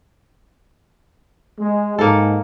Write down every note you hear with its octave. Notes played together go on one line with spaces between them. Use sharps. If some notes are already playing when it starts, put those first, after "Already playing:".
G#3
G#2 A#3 A4